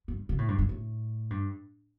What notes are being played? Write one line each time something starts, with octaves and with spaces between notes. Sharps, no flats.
G2
C3
A2
G2
G2
A2
G2